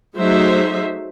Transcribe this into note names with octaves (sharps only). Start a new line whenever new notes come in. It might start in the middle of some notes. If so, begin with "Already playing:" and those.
F#3 A3 D#4 G#4 C5 E5